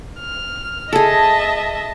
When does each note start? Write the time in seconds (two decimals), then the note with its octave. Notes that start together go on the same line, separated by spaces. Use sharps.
0.21 F6
0.93 G#4 A4 D#5 E5 A5